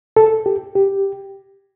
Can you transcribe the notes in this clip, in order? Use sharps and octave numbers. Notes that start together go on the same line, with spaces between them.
A4
G4
G4